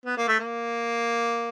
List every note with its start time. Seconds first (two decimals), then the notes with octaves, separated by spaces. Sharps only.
0.05 B3
0.17 A#3
0.28 A3
0.39 A#3